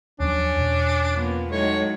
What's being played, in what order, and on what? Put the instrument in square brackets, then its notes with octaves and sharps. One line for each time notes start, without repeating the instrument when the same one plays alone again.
[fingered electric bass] D#2 F3 F#3 [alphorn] C#4 [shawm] D4
[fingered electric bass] E2 B2
[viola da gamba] F3 A#3 B3
[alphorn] A2 [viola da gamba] F#3 G#3 D#4 [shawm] C#5